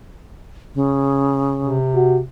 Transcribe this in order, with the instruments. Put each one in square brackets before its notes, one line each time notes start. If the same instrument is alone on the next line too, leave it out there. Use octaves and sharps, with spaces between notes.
[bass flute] C#3
[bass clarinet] C3
[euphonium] F#4